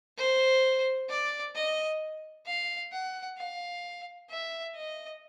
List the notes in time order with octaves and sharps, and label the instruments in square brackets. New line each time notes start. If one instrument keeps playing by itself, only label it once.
[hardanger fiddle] C5
D5
D#5
F5
F#5
F5
E5
D#5